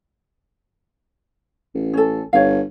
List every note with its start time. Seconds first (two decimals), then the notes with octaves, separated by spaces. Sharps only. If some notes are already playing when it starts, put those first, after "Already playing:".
1.74 A1
1.94 C#4 A4
2.33 G1 C#5 F5